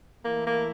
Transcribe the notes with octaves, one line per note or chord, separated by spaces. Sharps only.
E3 A3 A#3 E4
A#3